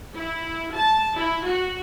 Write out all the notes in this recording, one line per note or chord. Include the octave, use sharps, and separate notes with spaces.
E4
A5
E4
F#4